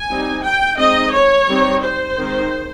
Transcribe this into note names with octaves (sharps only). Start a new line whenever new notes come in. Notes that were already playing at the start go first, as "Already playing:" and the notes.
Already playing: G#5
G3 C4 D#4
G5
G#3 C4 D#4 D#5
C#5
G3 C4 D#4
C5
D#3 G#3 C4 D#4